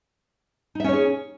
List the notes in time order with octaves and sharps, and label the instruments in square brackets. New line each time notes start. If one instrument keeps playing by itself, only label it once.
[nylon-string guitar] D#4
E5
C#4
C#5
G#4